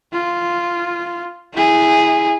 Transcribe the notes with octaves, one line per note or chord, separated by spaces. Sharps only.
F4
E4 G#4